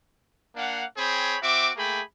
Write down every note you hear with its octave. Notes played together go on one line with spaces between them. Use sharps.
A#3 D4 F5 F#5
C4 G#4 C#5 G5 B5
C4 F#4 E5 D6
A3 A#3 G#4 G5 B5